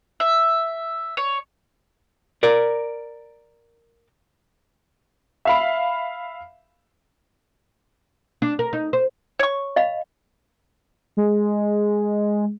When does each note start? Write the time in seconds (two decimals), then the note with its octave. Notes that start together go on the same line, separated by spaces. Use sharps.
0.20 E5
1.17 C#5
2.43 A#4 D5
5.45 E5 F5 B5
8.42 D4
8.59 A#4
8.73 D#4
8.93 C5
9.39 C#5 C#6
9.76 D#5 F5 B5
11.17 G#3